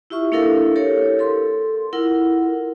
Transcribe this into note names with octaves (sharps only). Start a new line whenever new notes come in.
E4 F4 G4 E5 C#6
A#3 D4 E4 A4 A#4 F5
G4 A4 A#4 C#5
A4 C6
E4 F4 A#4 F#5